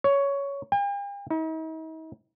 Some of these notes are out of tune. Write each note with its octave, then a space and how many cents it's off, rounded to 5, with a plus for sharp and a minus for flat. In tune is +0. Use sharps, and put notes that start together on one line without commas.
C#5 +10
G5 +45
D#4 +45